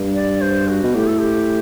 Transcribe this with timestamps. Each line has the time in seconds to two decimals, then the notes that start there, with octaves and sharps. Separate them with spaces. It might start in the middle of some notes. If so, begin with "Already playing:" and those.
Already playing: G2
0.14 D5
0.41 C5
0.68 F#4
0.83 B2
0.94 A2 G4
1.07 A4
1.19 G4